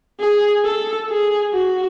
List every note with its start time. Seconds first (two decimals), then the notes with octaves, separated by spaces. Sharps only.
0.20 G#4
0.64 A4
1.09 G#4
1.53 F#4